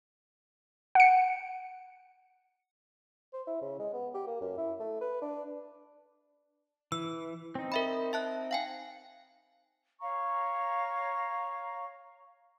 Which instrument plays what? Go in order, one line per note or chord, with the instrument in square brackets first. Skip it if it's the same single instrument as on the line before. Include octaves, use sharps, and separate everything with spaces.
[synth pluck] F#5 C#7
[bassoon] C5
E4
C#3
G#3
B3
G4
A#3
F#2
E4
A3
B4
D4
[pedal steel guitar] E3 [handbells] E6
[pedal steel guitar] C4 D#4
[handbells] A#4 E5 B5
E5 A5 F#6
F5 G5 G#5
[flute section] C#5 F5 A#5 C#6